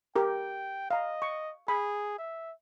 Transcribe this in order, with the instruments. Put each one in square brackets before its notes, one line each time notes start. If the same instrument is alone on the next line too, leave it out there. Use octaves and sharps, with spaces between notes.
[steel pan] G4 A#4 [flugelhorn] G5
[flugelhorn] D#5 [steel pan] F5 A#5
[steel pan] C#6
[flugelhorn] G#4 [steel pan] B5
[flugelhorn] E5